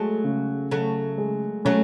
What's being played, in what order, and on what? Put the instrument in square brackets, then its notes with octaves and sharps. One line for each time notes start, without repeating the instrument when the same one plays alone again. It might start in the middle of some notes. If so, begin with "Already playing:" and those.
Already playing: [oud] F#3 A3 [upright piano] G#3
[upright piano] C#3
[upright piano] C#3 [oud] F#3 A3
[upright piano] G#3
[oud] F#3 A3 [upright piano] C#4